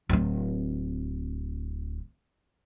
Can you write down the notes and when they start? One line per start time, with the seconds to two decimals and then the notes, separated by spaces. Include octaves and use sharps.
0.09 D1 C4